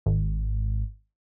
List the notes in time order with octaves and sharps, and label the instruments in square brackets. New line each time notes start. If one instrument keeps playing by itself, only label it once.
[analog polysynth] G#1